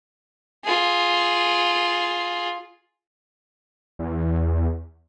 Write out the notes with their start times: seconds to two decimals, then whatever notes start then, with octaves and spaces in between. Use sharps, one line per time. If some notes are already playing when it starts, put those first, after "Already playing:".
0.65 F4 G#4
3.99 E2